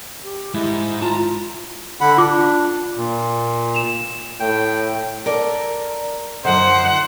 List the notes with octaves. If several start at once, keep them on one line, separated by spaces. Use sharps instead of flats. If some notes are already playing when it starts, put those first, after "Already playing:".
G4
G#2 E4
F4 A5 A#5
D3 F#5 B5
D4 F4 D6
A#2
E7 F7
A2 G5
A4 A#4 D5
F#2 D3 F3 D#4 C5 F#5